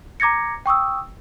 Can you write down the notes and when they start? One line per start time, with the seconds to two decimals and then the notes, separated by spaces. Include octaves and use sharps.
0.20 A#5 D6 G#6 A#6 C#7
0.66 G5 C#6 D#6 E6